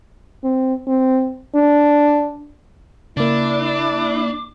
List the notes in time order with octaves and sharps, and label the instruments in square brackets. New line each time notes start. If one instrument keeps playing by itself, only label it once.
[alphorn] C4
C4
D4
[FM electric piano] C#3 A#3 [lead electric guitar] D4 [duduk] E4 [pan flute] D6